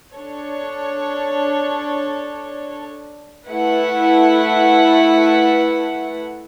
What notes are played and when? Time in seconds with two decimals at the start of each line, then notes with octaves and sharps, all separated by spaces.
0.13 D4 A4 C#5
3.49 A3 E4 B4 F#5